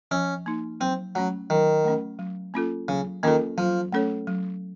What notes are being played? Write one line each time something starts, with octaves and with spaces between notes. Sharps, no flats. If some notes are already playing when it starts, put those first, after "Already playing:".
F3 C#4
A#3 D#4
F#3 C4
F#3 A3 C#4
D#3 F#3
A3 C#4
F#3
A#3 C#4 F4 A4
C#3 F#3
D#3 A#3 C#4 F4 A4
F3 F#3
A3 C#4 A4 C#5
F#3